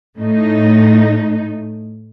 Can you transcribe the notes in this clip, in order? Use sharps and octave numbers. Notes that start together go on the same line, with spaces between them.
A2 A3 D#4